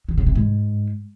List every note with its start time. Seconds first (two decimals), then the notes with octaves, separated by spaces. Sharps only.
0.09 D#3
0.18 C#3
0.26 C3
0.35 G#2